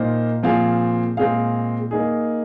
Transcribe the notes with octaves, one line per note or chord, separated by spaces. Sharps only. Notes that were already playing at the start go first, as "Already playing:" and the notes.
Already playing: A#2 A#3 D#4 C5
A#2 F3 C4 G#4 F5
A#2 G#3 C4 G#4 F5
A#3 D#4 G#4